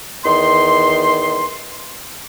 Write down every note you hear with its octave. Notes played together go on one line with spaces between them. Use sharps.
E2 D#3 C6